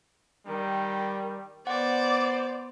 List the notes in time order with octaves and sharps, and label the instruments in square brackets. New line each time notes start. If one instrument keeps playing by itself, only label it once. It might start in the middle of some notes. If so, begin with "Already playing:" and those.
[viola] D#3 [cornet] G3
[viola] B3 [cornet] C5 [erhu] D5 [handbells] F#5